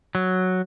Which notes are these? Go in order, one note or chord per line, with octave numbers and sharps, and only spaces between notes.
F#3